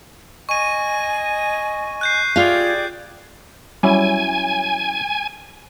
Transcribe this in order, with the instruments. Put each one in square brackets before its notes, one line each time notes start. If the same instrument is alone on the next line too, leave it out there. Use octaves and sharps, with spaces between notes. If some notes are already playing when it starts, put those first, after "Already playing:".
[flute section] D#5 G#5 [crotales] C#6 D#7
[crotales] F#6 G6 C7
[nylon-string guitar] F4 F5 [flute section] G4 G#4 D5
[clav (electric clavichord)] F#3 C#4 E4 [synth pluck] G3 [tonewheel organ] G#5